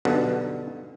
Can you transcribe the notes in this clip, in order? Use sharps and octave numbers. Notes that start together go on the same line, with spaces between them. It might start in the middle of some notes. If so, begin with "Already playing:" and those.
B1 G2 B2 D3 F#5